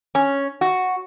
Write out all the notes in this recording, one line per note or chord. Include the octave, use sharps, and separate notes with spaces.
C#4
F#4